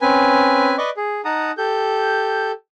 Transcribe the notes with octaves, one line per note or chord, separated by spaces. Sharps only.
C4 C#4 B4 G#5
B4 D5 D#5 C#6 D6
G#4
D#4 F#5 A5 A#5 D#6
G4 A4 G6